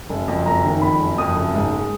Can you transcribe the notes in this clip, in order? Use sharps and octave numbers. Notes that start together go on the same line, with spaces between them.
F#1
F2
F#1 A#5
D#3
F2 B5
F#1
F2 D#6
F#1
G#2
G#3